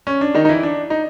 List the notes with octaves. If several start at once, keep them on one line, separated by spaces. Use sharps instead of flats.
C#4
D4
D#3 D#4
D#4
E3 E4
D4
D#4